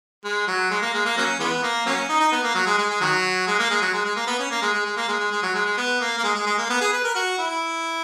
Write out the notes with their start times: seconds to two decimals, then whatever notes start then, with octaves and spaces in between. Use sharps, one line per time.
0.24 G#3
0.48 F#3
0.70 G#3
0.82 A#3
0.94 G#3
1.05 A#3
1.17 F#3 A#3 C#4
1.39 E3 G#3 B3
1.63 A#3
1.86 F#3 A#3 C#4
2.09 D#4
2.20 D#4
2.32 B3
2.43 A#3
2.55 F#3
2.67 G#3
2.78 G#3
2.90 G#3
3.01 D#3 F#3
3.47 G#3
3.59 A#3
3.70 G#3
3.82 F#3
3.93 G#3
4.05 G#3
4.16 A#3
4.27 B3
4.39 C#4
4.51 A#3
4.62 G#3
4.74 G#3
4.85 G#3
4.97 A#3
5.08 G#3
5.20 G#3
5.31 G#3
5.43 F#3
5.55 G#3
5.66 G#3
5.77 B3
6.00 A#3
6.18 A#3
6.24 G#3
6.35 G#3
6.46 G#3
6.58 A#3
6.70 B3
6.81 G#4
6.92 B4
7.04 A#4
7.15 F#4
7.39 E4